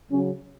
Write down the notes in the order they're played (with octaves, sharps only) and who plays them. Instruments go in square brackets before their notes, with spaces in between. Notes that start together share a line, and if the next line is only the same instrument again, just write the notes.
[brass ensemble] C#3 F#3 C#4